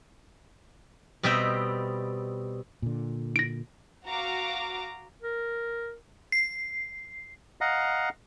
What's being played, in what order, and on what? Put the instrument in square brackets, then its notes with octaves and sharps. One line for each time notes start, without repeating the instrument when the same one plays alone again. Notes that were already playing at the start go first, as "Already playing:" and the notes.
[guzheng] B2 G3 C4 D#5 E5 G5
[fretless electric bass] A#2 D3
[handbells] A#6 D7
[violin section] F#4 F5 A#5 D6
[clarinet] A#4
[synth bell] C7
[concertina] D#5 F5 F#5 A#5